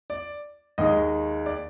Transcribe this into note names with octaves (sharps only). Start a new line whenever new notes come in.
D5
D#2 D#3 G#3 D#5
D5